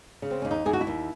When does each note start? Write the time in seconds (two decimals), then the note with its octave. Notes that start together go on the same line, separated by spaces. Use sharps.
0.22 C#3
0.31 C4
0.42 D#2 C#4
0.51 D#4
0.65 D#2 G#4
0.73 F#4
0.81 E4
0.87 D#2